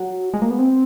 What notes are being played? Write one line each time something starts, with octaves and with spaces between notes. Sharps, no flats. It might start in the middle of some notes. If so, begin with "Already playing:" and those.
Already playing: F#3
G#3
A#3
B3
C4